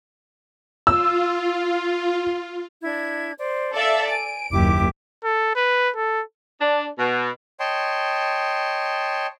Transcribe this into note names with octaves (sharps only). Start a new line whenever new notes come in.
F4 E6
D4 E4 G#6
C5 D5
A4 D5 E5 F5
G#5 D7
F#1 D#2 E4 G4 D6
A4
B4
A4
D4
B2
C#5 D#5 G5 A5 C6